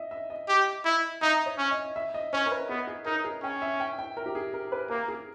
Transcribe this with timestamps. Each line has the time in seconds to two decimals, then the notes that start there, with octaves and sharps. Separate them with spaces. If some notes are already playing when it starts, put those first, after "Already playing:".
Already playing: D#5 E5
0.11 E5
0.30 D#5
0.49 G4
0.85 E4
1.22 D#4 E5
1.46 C#5
1.58 C#4
1.71 D#5
1.96 E5
2.14 D#5
2.33 C#4 C#5
2.46 A#4
2.51 B4
2.69 B3 G#4
2.87 G#4
3.06 D#4 A#4
3.25 G#4
3.43 C#4 G5
3.62 E5
3.80 G5
3.99 G5
4.17 A#4
4.26 G4
4.35 G#4
4.54 A#4
4.72 B4
4.90 A#3 A#4
5.08 G#4